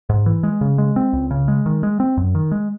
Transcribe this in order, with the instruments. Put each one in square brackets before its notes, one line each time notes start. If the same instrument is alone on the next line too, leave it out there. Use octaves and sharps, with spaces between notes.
[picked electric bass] G#2
E3
G#3
C#3
G#3
C4
C#2
C#3
G#3
D#3
G#3
C4
F#2
D#3
G#3